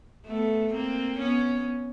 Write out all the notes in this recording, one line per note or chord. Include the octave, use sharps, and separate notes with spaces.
A3 B3
A#3 C4
B3 C#4